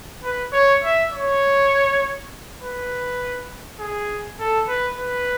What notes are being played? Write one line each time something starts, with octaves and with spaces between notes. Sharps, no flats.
B4
C#5
E5
C#5
B4
G#4
A4
B4
B4